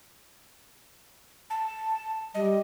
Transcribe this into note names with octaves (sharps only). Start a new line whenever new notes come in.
A5
G3 D#5